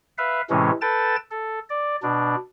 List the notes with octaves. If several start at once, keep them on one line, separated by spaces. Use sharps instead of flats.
B4 E5 F5
A2 C3 E3 G#3 C#4
A4 B4 G5 A5 A6
A4
D5
B2 D4